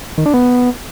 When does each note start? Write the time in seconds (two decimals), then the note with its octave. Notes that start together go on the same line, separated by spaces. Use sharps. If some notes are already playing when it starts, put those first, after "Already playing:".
0.18 D#3
0.26 D4
0.34 B3